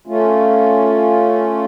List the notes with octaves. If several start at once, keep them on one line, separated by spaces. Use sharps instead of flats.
A3 C#4 F4